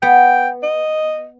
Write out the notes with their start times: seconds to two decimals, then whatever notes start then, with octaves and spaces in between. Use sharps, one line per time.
0.02 B3 G5
0.63 D#5